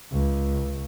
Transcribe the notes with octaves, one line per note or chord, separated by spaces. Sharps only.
C#2 C#3